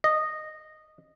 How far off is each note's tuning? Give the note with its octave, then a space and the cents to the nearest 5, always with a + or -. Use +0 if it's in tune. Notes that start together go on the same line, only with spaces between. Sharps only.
D#5 -10